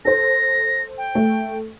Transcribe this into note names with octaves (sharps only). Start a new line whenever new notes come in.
A4 C5 A#6
G5
A3